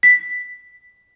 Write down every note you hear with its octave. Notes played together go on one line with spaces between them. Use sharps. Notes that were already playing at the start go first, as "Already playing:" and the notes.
B6